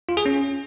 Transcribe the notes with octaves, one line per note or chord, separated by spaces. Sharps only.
F4
G#4
C#4